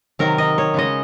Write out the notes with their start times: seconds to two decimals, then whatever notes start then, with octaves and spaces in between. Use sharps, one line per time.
0.19 C3 D#3 F#3 A#4
0.38 D#5
0.58 C#5
0.74 C#3 G#3 D#5